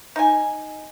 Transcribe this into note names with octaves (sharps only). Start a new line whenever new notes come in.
D#4 G#5